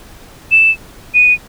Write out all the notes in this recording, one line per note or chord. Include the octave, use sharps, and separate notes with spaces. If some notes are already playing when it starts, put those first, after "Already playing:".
E7
D#7